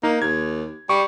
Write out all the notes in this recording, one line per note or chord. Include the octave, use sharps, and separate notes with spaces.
A#3 D#4
D#2 G#6
G3 C#6